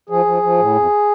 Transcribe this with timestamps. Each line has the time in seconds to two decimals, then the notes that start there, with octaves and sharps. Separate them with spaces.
0.10 F3 G#4
0.25 F3
0.43 F3
0.59 A2
0.75 F2